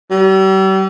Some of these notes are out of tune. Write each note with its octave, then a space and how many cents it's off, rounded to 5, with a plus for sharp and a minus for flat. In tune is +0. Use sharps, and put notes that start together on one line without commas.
G3 -40